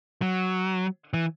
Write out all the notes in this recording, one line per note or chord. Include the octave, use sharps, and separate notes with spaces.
F#3
E3